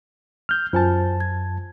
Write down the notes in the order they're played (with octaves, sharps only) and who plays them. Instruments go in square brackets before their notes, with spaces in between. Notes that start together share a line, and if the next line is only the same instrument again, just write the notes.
[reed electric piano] F6 G6
[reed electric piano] F#2 A5 [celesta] F4 C5 G#5
[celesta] G#6